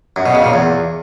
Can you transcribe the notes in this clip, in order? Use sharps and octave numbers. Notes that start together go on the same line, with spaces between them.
F#2
B2
C#3
A#2
E2